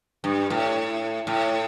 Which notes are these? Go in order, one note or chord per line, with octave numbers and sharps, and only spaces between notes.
G2
A2
A2